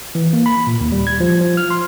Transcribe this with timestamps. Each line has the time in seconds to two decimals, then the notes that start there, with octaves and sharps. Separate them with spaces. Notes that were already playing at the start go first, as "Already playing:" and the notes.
0.15 E3
0.33 A#3
0.46 B5
0.67 A#2
0.81 D#2
0.92 G3
1.07 G#6
1.20 F3
1.41 F3
1.57 F6
1.70 C6